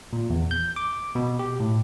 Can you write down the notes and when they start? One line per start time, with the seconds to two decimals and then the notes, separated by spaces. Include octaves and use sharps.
0.13 A#2
0.30 E2
0.51 G6
0.76 D6
1.15 B2
1.39 G4
1.60 A2